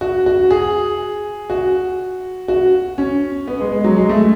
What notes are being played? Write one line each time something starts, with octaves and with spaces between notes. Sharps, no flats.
F#4
F#4
G#4
F#4
F#4
C#4
B3
G#3
G#3
F#3
G#3
A3